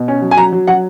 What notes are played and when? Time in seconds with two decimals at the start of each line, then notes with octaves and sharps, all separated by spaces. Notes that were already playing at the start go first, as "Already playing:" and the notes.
Already playing: B2
0.08 C#4
0.22 F#3
0.31 G#5
0.37 F#3 A#5
0.52 F#3
0.67 F#3 F#5